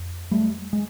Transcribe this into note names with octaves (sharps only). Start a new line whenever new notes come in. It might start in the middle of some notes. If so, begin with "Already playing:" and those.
Already playing: F2
G3 A3
G#3